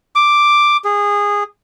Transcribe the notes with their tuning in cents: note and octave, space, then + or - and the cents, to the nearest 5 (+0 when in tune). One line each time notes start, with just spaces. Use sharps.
D6 +5
G#4 -20